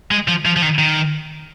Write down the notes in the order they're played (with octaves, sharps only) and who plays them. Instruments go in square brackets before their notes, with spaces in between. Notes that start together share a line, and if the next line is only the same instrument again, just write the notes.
[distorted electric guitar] G#3
F3
F3
F3
D#3
D#3